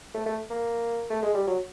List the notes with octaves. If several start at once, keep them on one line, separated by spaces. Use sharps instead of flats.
A3
A3
A#3
A3
G#3
G3
F#3